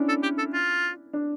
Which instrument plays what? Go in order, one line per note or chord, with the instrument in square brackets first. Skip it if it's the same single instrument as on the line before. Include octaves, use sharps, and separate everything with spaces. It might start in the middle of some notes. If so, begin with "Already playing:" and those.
Already playing: [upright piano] C#4 D4 E4
[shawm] A4
G4
A4
F4
[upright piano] D4